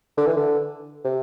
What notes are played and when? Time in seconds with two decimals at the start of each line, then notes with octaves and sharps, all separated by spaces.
0.17 D3
0.27 E3
0.36 D3
1.04 C3